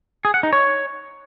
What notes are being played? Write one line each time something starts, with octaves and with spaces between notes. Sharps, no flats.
G#4
F#5
D#4
C#5